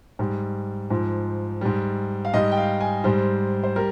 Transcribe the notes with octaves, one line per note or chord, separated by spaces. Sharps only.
G#2 G3
G#2 F3
G#2 G3
F5
G#2 G3 D#5
G5
F5
G#5
G#2 G3 C5
C5
G3 A#4